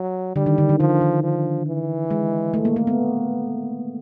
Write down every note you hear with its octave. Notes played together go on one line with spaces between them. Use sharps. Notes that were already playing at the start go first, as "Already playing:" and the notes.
Already playing: F#3
D3 G3
D#3
D3
D#3
D3 F3
D#3
F3
E3
G#3
A3
A#3
A3
B3